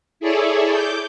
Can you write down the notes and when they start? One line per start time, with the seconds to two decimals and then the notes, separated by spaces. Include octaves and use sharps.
0.20 E4 G#4 A4 C#5 D5
0.71 D6 G6